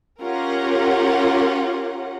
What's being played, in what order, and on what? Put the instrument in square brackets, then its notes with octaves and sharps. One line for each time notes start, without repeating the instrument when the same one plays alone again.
[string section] C#4 F4 G4 A#4 F#5